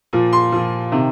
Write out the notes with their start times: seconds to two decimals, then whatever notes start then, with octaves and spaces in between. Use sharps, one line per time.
0.13 A#2 F3
0.33 C6
0.52 A#2 F3
0.92 C3 D#3